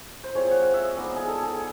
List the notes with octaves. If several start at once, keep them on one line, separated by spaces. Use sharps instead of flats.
C5
G#3 C4 F4 C#5
F#5
F5
E5
D#5
G#3 B3 D#4 D5
G#4
A4
G#4